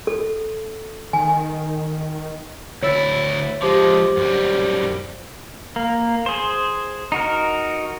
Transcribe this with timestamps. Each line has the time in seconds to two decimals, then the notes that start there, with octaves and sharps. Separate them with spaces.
0.07 A4
1.13 D#3 G#5
2.82 D2 E4 C#5 E6 A6
3.62 F3 G#3 G4 C5 D6
4.17 F#2 G3
5.76 A#3
6.26 G#4 C5
7.12 D#4 F#4 A#4